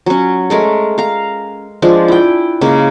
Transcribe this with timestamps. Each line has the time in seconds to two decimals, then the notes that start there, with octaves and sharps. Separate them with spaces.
0.06 F#3 C#4
0.50 G#3 A3 A#4
0.98 F5 A#5
1.82 F3 G#3 D4
2.08 E4 G5
2.61 C#3 G#3 A#3